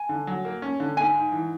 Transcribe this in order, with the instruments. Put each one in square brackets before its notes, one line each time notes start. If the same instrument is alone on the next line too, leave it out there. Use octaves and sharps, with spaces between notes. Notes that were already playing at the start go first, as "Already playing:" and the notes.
Already playing: [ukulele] G#5
[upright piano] D3
F#3
A#3
C#4
D3
[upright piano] G#2 [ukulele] G#5
[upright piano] G#2
E3